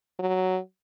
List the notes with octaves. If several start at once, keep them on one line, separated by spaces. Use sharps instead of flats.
F#3